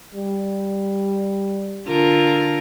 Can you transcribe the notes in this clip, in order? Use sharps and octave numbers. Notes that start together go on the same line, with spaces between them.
G3
D3 F4 A#4